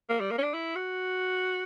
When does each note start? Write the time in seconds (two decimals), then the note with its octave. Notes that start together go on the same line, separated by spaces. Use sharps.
0.09 A#3
0.20 G3
0.31 A#3
0.38 C#4
0.43 D4
0.54 E4
0.75 F#4